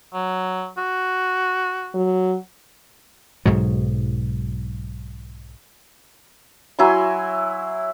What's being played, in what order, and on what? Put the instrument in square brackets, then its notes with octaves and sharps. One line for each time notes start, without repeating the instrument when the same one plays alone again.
[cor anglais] F#3
F#4
[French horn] F#3
[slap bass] B1 G#2 B2 F#3
[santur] F#3 E4 G#5 C6